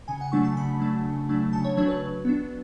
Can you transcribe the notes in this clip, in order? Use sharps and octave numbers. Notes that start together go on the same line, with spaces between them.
C#3 G#5
F#5
F#3 A3 D4 C#6
A5
C#3 B5
F#3 A3 D4
C#3
F#3 A3 D4
C#3 A5
C#5
F#3 A3 D4 C#5
B4
F#3
B3 D4